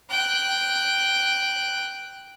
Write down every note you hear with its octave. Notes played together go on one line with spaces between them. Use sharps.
G5 F#6